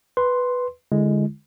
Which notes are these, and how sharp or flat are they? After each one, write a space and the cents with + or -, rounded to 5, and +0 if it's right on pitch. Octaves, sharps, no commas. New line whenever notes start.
B4 +0 C6 +0
D3 +0 G#3 +0 E4 +25